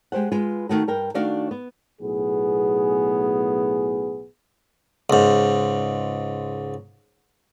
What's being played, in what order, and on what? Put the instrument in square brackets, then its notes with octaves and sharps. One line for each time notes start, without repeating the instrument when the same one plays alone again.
[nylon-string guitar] G#3 G4 C5 F#5
G#3 F4 B4
D#3 A3 F#4
G2 A#4 G5
D#3 A3 D4 F#4 D5 F5
B3
[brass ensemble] B1 A2 B3 G#4
[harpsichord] C#2 G#2